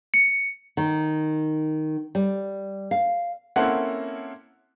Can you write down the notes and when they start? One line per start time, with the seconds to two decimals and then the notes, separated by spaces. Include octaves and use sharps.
0.14 C#7
0.77 D#3
2.15 G3
2.91 F5
3.56 A#3 C4 C#4 E4 A4 F#5